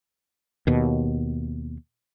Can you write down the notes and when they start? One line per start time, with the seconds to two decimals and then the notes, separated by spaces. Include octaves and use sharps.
0.67 D#2 B2